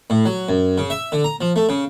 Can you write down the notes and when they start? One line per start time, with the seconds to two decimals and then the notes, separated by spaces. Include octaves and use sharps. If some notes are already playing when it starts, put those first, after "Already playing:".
0.10 A2
0.25 F#3
0.49 F#2
0.78 C#3
0.90 E5
1.12 D3
1.24 A#5
1.41 F3
1.56 A3
1.69 C#3